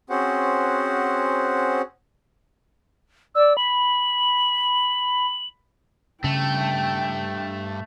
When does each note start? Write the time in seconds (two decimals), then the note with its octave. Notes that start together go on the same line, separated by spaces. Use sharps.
0.10 C4 C#4 F#4 G#4 C5 F#5
3.35 D5 E6
3.57 B5 F#7
6.24 G2 C#3 A3 E5 G5